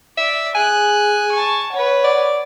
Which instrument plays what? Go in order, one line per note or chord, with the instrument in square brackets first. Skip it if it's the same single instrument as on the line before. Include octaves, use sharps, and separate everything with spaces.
[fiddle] D5 [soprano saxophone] E5
[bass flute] G#4 [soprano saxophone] G#5 [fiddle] F#6
[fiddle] A5 C#6
[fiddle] B4 C#5 [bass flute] F#5
[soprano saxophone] D5